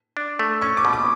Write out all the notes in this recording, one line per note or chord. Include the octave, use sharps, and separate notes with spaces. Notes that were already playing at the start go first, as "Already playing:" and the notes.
D4
A3
C#4 C#6
D6
B2
D6